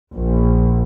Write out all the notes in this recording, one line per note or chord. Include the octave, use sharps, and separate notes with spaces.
A#1